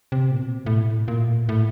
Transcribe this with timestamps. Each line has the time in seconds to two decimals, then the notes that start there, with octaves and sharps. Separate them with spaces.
0.12 C3
0.31 A#2
0.40 B2
0.66 A2
1.08 A#2
1.49 A2